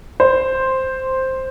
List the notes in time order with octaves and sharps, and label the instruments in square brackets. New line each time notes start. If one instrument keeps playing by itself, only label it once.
[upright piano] C5